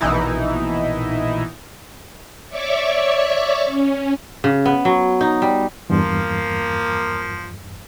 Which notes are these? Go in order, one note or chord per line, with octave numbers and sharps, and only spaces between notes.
A#1 B2 E3 D#4 E4
C#5 D5 E5 C#6 D6
C#4
C#3
B3
F#3
D#4
G3
E2 G2 F3 A#3